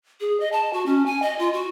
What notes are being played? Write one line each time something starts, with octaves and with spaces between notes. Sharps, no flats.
G#4
D#5
A5
F#4
C#4
G#5
D#5
F4
F#4